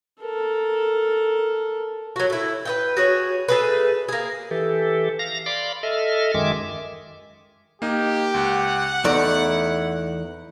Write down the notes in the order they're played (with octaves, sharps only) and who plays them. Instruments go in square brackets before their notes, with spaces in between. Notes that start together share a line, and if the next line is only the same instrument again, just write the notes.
[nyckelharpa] A4 A#4
[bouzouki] F#3 F#4
A3 E4
B4 D#5 G5
F#4 G#4 C#5
A3 G#4 B4
A#3 G#4
[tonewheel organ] E3 G4 A4
F5 A#6
D5 F5 B5 C6 D6
A4 D#5 E5 F6
F#2 D#3 G#3 E5 D6
[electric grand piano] A#3 D#4 [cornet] G4
[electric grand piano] C#2 [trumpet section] F#5
[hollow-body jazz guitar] E2 A3 D5 [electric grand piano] D#4 [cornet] E4